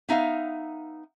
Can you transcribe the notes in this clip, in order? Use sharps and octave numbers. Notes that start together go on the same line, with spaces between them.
B3 D#4 E5 F5